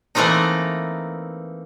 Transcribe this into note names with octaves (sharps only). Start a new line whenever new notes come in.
E3 A3 A#3 C4 D#4